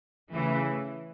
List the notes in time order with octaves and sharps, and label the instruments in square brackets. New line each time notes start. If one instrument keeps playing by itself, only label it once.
[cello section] C#3 E3 A3